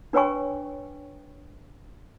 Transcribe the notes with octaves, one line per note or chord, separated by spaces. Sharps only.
D4 B4 C#5 G5 G#5 C#6